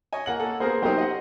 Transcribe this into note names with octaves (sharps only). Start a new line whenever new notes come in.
C#5 D#5 G#5
A#3 F#5 F#7
A4
A#3 B3 G#4 A#4 C5
F#3 A#3 D#4 G4 C5 G5
D#5 F#5